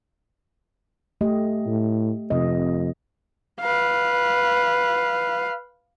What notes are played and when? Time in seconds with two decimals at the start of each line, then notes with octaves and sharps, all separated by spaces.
1.21 A3 G4 D#5
1.66 A2
2.30 F2 C3 D#5
3.60 B4 F5